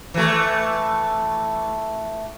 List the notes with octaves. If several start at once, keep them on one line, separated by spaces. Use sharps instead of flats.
E3 A3